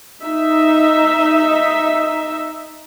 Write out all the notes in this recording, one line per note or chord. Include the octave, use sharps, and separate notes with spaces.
D#4 E5